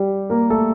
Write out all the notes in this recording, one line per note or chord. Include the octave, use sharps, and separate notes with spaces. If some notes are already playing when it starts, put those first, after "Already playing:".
Already playing: G3 G4
A#3 A#4
A3 A4